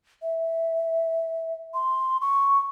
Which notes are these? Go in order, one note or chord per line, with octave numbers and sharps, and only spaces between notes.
E5
C6
C#6